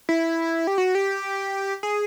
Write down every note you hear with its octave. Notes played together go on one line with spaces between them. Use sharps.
E4
G4
F#4
G4
G#4